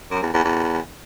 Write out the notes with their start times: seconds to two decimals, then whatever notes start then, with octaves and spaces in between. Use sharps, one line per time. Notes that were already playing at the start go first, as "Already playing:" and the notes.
0.11 F#2
0.22 E2
0.33 E2
0.44 E2